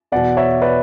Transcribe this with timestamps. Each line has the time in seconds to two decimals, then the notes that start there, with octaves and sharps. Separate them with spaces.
0.12 E2 B2 D5 F#5
0.37 C#5 E5
0.62 B4 D5